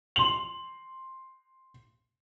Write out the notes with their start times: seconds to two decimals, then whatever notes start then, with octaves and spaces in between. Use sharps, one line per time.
0.16 C6 F#7